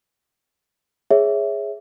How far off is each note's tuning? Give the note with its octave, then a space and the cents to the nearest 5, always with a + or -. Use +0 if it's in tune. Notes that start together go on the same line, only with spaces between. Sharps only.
G#4 +0 C#5 +0 E5 +0